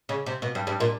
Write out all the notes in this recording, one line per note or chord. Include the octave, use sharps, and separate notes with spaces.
C#3
C3
B2
G2
G2
A#2